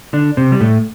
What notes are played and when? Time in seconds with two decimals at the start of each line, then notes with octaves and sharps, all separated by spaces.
0.13 D3 D4
0.37 C3 C4
0.52 G3
0.60 A2 A3